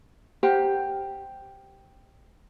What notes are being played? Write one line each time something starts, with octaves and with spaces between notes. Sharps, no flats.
G4 A#4 C5 F#5